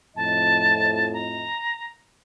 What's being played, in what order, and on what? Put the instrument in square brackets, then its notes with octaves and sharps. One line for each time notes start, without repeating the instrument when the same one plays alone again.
[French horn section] F2 A2 D#5 [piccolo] A5
[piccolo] A#5